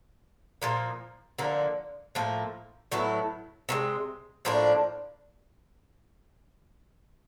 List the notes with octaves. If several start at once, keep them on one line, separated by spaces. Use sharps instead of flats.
A#2 F3 A#3
D3 F3 A#3
A2 F3 A#3
A2 F#3 B3 E4
C3 D#3 G#3
A2 F3 A#3 D4